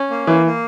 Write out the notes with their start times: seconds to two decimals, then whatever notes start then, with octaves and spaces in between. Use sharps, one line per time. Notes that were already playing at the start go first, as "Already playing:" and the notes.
Already playing: C#4
0.10 A#3
0.27 E3 A#3
0.46 A#3